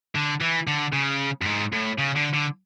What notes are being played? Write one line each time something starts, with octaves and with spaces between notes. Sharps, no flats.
D3
E3
D3
C#3
F#2
G#2
A2
C#3
D3
D3